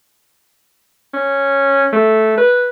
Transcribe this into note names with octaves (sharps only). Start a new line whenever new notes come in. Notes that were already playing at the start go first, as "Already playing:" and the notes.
C#4
A3
B4